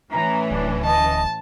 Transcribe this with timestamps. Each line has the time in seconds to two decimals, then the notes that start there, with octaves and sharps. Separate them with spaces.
0.11 A2 E3 C#4 A#5
0.51 D1 D4
0.84 D#5 A5